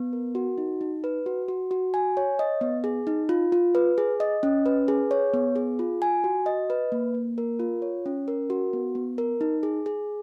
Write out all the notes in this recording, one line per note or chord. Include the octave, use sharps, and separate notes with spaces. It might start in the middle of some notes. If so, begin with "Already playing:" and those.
Already playing: B3
A#4
F#4
D#4
D#4
B4
F#4
F#4
F#4
G#5
C#5
D#5
B3
G#4
D#4
F4
F4
B4
G#4
D#5
C#4
B4
G#4
C#5
B3
G#4
F4
G#5
F#4
D#5
B4
A#3
A#3
A#4
F4
C#5
C#4
A#4
F#4
B3
B3
A#4
D#4
G#4
G#4